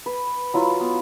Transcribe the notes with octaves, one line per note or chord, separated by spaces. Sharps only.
B4
F#3 E4 F4
B3